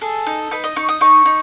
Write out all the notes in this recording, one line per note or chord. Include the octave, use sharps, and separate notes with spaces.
G#4 A4
D#4
D#4 B4
D#5
D#4 C#6
D#6
D#4 C#6
D#4